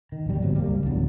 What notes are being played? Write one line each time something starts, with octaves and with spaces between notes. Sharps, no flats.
D#3
D1 A#1 G3
D1 G1 F#3 C4
G3 A#3
C#2
D1 E2 F#3 D4